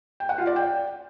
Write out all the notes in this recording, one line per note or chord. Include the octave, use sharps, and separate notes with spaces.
G5
F#5
F4
D5
G5